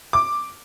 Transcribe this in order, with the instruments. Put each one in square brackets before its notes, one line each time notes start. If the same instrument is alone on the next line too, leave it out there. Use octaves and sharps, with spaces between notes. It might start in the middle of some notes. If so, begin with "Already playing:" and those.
[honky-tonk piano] D6